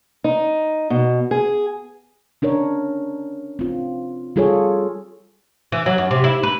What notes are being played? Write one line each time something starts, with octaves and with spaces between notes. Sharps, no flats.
D#4
B2
G#4
C#4 D4 A#4 C#5
C4 F4
G3 F4 G#4 A4 C#5
E3
F#3
F#2
C3
E4
B4